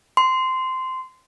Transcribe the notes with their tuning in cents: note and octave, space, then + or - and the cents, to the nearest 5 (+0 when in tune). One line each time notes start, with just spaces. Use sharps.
C6 -15